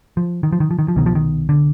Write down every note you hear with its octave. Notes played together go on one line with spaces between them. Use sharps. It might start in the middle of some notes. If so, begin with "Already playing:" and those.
F3
D#3
F3
D#3
F3
D#3
F3
C2 B2 D#3
F3
D#3
D3